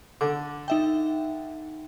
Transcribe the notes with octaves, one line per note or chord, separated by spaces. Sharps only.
D3 D6
D#4 E5 G5